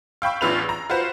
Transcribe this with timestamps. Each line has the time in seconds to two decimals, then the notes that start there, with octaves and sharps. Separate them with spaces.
0.22 F5 G5 B5 C#6 E6
0.41 A1 E2 D4 F4 B4 F7
0.69 A#5
0.90 F4 F#4 B4 C5